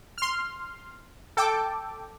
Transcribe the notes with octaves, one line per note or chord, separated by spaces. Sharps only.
C6 F6
A4 G5 D6